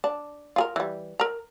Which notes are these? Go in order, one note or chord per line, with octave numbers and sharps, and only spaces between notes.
D4
F4 G#4 A#4
E3 G3
A#4 A#5